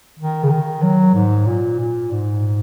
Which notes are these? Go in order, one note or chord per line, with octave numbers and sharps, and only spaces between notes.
D#3
C#3
D#3
F#3
G#2
A#2
A#2
G#2